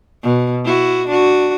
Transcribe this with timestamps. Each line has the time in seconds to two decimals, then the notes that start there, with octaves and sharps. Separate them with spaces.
0.23 B2
0.65 E4 F#4
1.08 D4 F#4